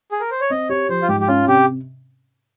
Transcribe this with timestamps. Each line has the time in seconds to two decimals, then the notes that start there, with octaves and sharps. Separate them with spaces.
0.12 G#4
0.20 A#4
0.31 C5
0.41 C#5
0.50 C4 D#5
0.69 G4 C#5
0.89 F3 C5
1.02 F4
1.08 G#2 G4
1.20 G4
1.28 C#4 F4
1.47 C3 G4